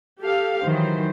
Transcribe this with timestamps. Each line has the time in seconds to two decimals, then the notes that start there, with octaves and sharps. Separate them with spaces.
0.21 G4 A4 F5
0.64 D#3 E3 F#3 C5